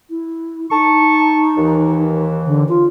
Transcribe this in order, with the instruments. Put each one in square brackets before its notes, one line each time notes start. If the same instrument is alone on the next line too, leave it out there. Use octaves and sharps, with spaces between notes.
[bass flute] E4
[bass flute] D#4 [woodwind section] A5 C#6
[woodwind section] D#2 E3
[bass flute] D3
F4